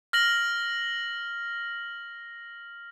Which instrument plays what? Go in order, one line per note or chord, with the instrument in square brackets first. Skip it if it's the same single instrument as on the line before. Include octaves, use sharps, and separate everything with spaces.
[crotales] F6 A#6 F#7